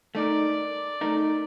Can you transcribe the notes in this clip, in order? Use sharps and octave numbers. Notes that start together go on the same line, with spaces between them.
A3 D#4 A#4 D5
A3 D#4 A#4